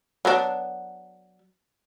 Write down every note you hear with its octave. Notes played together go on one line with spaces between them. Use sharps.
F#3 B3 D4